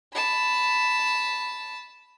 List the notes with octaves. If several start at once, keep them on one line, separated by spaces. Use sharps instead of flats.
A5 B5